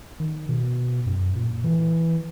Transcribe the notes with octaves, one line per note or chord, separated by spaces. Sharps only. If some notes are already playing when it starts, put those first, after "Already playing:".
D#3
B2
F#2
A#2
E3